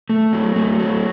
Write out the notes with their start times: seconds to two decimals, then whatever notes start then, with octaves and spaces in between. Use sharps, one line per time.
0.10 A3
0.33 F#3
0.56 A3
0.80 F#3